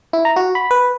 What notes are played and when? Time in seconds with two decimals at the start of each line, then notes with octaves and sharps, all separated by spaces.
0.13 E4
0.25 A#5
0.36 F#4
0.55 B5
0.71 B4